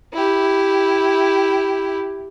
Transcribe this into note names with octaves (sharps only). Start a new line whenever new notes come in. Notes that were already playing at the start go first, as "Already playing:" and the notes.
E4 G4